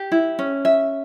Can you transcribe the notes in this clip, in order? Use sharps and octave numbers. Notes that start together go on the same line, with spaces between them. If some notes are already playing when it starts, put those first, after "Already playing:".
Already playing: G4
E4
C#4
E5